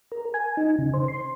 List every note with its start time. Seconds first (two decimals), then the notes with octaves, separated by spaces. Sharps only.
0.12 A#4
0.34 G#5
0.57 D#4
0.78 C#3
0.94 C5
1.08 C6